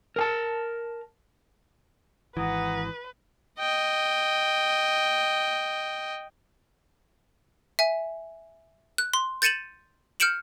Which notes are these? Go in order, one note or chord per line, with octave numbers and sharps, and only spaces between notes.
A#4 G#5 A5
G#1 E3 B4 F#5 A#5 D#6
D#5 G5
E5 G#5
F#6
C6
G6 A6 C#7 D#7 E7 F#7
F6 G6 C#7 D7 E7 F#7